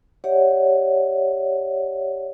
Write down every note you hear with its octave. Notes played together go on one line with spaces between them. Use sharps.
G4 C#5 D5 E5 F#5